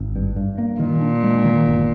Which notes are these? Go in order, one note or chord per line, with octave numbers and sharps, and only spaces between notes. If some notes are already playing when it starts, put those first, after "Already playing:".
Already playing: G#1
G2
G2
A#3
A#2 D#3
D4
G#3
D#3
G1